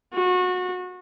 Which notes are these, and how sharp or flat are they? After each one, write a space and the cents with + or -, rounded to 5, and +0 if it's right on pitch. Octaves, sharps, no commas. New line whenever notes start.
F#4 -25